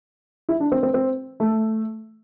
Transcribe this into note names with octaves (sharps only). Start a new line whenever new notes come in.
E4
D4
C4
C4
C4
A3